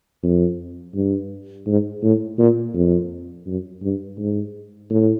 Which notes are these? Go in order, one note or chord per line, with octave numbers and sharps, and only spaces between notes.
F2
G2
G#2
A2
A#2
F2
F#2
G2
G#2
A2